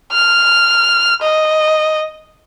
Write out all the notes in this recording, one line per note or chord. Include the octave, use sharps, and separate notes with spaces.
F6
D#5